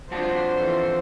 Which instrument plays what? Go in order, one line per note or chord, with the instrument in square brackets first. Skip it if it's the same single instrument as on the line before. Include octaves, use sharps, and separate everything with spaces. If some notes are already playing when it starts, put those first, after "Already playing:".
[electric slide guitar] F2 F#4 A5 [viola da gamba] D4 F4 [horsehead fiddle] C5
[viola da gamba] E3 F4 A4